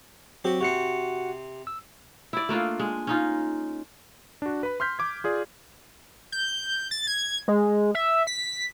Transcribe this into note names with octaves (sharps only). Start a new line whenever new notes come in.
F#3 C4 F#4 G4
C3 C4 F#4 F#5 C#7
E6
E4 D5
A3 A#3 D4 F4
G#3
C#4 D#4 F4
D4 F#4
B4 B5
C6 F6 G6 B6
D6 G#6
F4 G#4 D5
G6
A6
G#6
G#3
E5
B6